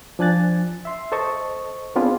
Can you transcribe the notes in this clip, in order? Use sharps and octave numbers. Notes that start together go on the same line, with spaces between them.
F3 D4 G#5 F#6 A6
E5 C6
A4 C5 D#5 A5 C#6
B3 C4 D4 F4 G#4 B4